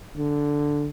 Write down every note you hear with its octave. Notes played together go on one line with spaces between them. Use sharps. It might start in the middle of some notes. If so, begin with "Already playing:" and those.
D3